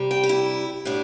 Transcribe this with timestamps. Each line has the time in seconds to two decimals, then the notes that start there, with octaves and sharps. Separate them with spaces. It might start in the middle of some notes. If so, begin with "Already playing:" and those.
Already playing: C3 G3
0.11 G5
0.23 G4
0.29 E4
0.85 A2 G3 D4